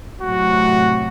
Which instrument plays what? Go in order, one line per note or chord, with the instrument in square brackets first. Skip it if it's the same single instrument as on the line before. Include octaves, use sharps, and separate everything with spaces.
[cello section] A2 C3 F#3 [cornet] F#4